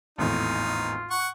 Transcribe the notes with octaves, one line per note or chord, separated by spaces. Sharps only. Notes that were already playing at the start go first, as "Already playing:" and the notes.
G#1 E2 A2 D#4 F4
F#5 C#6